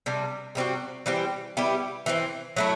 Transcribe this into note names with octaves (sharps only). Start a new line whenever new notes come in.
C3 G3 D4
C3 G3 C4 F#4
E3 G3 C4 G4
G3 B3 E4 G4
E3 A3 C4
F#3 A3 E4